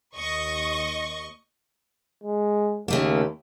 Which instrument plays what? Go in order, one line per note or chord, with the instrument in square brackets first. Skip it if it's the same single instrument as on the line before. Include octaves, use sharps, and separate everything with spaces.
[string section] D#2 D#5 C#6
[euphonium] G#3
[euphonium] D#2 [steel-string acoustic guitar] C#3 A3 A#3